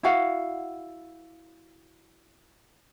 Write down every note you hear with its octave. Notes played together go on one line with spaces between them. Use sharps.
E4 F#4 F5 F#5